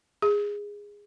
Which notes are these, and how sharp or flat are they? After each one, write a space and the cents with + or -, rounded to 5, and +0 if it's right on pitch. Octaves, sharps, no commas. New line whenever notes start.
G#4 -15